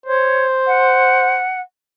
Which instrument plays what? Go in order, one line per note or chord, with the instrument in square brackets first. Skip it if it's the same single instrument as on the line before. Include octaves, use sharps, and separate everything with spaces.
[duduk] C5 [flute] C#5
[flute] F#5